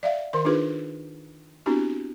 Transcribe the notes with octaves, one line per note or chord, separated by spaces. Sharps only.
D5 E5 F5
D#3 A#4 C6
D4 D#4 F4 G#4 B4
B3 C4 D4 E4 F#4 G4